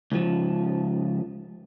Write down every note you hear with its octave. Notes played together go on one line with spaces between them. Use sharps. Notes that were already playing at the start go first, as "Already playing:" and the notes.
C#2 F3